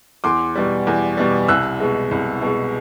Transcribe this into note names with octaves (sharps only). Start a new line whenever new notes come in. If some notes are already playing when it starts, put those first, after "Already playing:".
E2 C6 D6
B2 G3
E2
B2 G3
C2 E6 F#6
B2 G#3
C2
B2 G#3